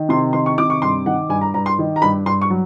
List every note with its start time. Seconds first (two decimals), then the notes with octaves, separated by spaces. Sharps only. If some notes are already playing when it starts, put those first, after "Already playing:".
Already playing: D#3
0.09 C3 C6
0.33 D#3 C6
0.46 C#6
0.58 C3 D6
0.70 C#6
0.82 G2 C6
1.06 D#3 F#5
1.29 G2 G#5
1.41 A#5
1.54 G2 A#5
1.66 C6
1.79 D#3
1.96 A#5
2.02 G2 B5
2.26 G2 C6
2.42 C#6
2.50 F#3